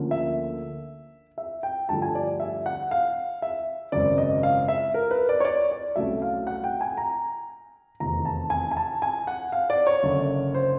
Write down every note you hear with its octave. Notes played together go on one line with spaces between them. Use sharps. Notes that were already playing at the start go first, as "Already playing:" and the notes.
Already playing: D2 D3 F3 A#3 C#4
E5
E5
G5
G2 D3 F3 A3 A5
G#5
D5
E5
F#5
F5
E5
G#1 F#2 C#3 D5
D#5
F5
E5
A#4
B4
D5
C#5
D5
D5
C2 B2 F#3 A3 C#4 E5
F5
F#5
G5
G#5
A#5
F1 E2 C3 D#3 A#5
A5
G#5
G#5
A5
G#5
F#5
F5
D5
C#5
F#1 F#2 D3
C5